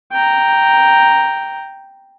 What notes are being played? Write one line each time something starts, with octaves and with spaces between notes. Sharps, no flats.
G5 A#5